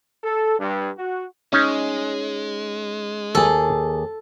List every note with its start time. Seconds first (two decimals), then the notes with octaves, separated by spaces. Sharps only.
0.24 A4
0.59 G2
0.98 F#4
1.53 G#3 C#4 D#4
3.35 D#2 G#4 A4